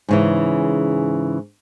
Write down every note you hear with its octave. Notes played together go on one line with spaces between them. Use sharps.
G#2 C#3 E3